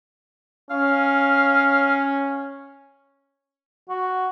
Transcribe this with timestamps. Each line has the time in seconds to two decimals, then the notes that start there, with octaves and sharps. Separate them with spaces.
0.71 C#4 F5
3.89 F#4